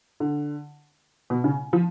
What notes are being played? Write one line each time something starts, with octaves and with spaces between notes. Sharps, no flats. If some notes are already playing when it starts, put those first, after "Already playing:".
D3
B2
C#3
F3